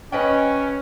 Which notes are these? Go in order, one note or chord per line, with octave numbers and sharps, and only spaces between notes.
C#4 B4 D#5 G5